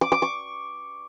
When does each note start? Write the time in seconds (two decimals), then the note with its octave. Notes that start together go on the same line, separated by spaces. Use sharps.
0.01 D6
0.12 D6
0.22 C#6